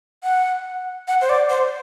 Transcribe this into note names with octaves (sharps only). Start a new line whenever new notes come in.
F#5
F#5
C5
D5
C5